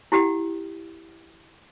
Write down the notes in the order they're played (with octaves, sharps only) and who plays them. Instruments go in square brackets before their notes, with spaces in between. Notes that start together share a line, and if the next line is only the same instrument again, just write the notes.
[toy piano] E4 G4 F#5 G5